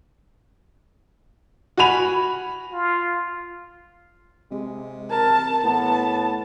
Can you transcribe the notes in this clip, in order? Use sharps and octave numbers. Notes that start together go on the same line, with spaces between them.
F#4 F#5 G#5 B5 F7
F4
C3 G#3
A#4 A5
A2 B3 A5